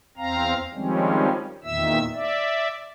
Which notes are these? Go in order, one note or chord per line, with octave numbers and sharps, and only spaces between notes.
E2 C4 F5 A#5
D#3 F3 G3 G#3 C4 C#4
E2 A#2 D#3 E5 E6
D5 E5